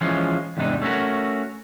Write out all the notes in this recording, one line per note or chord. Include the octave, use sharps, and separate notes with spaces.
E3 F3 G#3 C#4 F4
E2 G#2 C3 D4 D#4
A3 C#4 D4 F#4 A#4